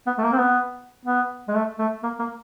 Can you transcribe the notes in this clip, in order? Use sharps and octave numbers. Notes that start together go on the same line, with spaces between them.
B3
A3
A#3
C4
B3
B3
G#3
A3
A3
A#3
A#3